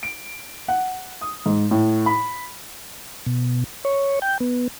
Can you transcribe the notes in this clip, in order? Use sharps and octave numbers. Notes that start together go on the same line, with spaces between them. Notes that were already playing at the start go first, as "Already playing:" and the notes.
D7
F#5
D#6
G#2
A2
B5
B2
C#5
G5
B3